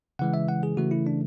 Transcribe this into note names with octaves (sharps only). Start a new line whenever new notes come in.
C#3 E3 G#3 F#5
E5
F#5
G#4
C#3 E3 A3 F#4
E4
D4